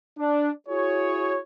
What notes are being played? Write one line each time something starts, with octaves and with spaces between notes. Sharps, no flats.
D4
E4 F#4 G#4 C#5